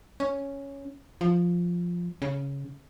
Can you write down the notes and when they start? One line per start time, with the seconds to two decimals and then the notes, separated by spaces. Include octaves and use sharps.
0.20 C#4
1.21 F3
2.22 C#3